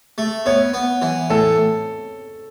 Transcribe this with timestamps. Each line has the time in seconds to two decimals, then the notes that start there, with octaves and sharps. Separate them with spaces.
0.18 A3
0.46 B3 C#5
0.74 B3
1.02 E3
1.30 A2 A4